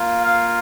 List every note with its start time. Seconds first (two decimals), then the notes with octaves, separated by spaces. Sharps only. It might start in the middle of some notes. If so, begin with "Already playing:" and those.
Already playing: A#3 F4
0.21 F5